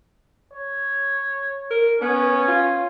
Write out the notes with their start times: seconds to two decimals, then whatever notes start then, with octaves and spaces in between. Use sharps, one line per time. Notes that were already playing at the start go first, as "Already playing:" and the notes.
0.53 C#5
1.71 A#4
2.01 B3 C#4
2.48 F4